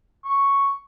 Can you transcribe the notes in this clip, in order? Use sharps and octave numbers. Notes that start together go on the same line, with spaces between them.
C#6